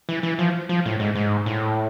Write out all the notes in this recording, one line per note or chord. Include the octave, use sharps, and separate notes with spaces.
E3
E3
F3
F3
A2
G#2
G#2
A2